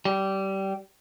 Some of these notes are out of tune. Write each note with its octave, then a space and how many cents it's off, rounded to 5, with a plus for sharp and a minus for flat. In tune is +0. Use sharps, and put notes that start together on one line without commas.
G3 -20